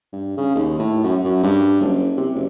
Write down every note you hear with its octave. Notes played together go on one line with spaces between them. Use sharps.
G2
C#3
D#2
A2
F#2
F#2
G2
F#1
C3
F#1